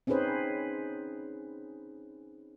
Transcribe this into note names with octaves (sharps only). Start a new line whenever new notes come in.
C4 C#4 D#4 G#4 B4 C5